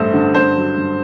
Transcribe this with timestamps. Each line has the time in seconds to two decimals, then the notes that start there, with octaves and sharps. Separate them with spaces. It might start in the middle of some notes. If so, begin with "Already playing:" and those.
Already playing: A1 G2 A3 C5
0.14 D3
0.34 G2 C5
0.55 F#3
0.76 G2